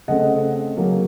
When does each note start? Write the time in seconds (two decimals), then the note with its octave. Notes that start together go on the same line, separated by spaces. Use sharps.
0.08 C#3 A3 C4 D#5 F#5
0.77 C#3 F#3 A#3 C#4